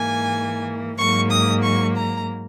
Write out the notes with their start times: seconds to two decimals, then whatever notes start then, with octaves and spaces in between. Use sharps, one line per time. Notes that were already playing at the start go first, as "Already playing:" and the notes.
Already playing: G#2 E3 A#3 G#5
0.98 G#2 F#3 A#3 C#6
1.30 D#6
1.63 C#6
1.96 A#5